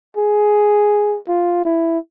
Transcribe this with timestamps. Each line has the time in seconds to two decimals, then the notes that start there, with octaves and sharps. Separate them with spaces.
0.17 G#4
1.28 F4
1.65 E4